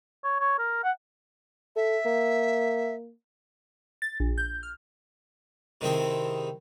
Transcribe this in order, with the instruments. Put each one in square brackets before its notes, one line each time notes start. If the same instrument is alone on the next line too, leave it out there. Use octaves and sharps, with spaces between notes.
[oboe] C#5
C#5
A#4
F#5
[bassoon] A4 [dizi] E5
[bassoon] A#3
[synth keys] A6
A#1
G6
F6
[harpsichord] C3 D#3 C4 E4 G#4